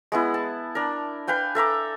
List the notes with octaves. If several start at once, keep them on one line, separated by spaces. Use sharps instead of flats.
G#3 B3 E4
A5
D4 A#4
B4 F5 G5 G#5
A4 E5 A#5 D6